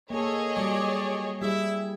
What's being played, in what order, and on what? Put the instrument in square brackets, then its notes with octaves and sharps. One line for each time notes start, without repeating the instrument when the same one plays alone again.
[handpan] A#3 A4 [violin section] G#4 C#5 D#5
[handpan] F#3 G3 [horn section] D5
[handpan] G3 G#4 [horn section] E4 E5